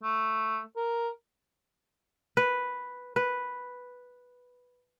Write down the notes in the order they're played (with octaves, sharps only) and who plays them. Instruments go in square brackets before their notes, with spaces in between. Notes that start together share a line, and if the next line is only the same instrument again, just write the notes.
[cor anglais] A3
A#4
[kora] B4
B4